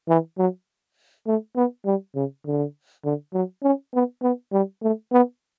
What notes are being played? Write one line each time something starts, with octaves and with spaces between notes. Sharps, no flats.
E3
F#3
A3
B3
G3
C#3
D3
D3
F#3
C#4
B3
B3
G3
A3
B3